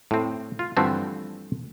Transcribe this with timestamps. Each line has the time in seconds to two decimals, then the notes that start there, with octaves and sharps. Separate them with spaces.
0.11 A2 C4
0.59 F4
0.77 G2 D3 E3 F3 A3 C4